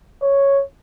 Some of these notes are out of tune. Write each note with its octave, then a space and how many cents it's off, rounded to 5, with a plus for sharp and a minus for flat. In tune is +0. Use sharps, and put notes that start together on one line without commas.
C#5 +0